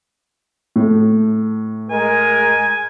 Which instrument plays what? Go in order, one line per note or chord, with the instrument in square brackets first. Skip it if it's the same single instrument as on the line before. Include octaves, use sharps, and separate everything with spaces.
[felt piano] A2 A3
[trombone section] G#3 A#4 [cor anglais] G#5